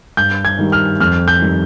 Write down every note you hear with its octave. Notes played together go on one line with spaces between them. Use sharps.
G2 G6
G#6
D#3 G3
F6
F2 F6
G6
D#3 G3